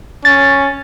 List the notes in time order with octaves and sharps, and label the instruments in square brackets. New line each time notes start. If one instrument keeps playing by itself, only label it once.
[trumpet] C#4 [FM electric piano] A6